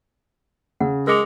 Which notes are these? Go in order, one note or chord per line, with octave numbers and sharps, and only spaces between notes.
C#3 F#5
G#3 A#4 D6 A#6 C#7 F7